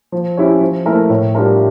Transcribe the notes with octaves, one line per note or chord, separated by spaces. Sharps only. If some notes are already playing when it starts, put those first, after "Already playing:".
F3
C#4 E4 G4 C#5
F3
A3 E4 A#4
A2
G3 D4 F4 A#4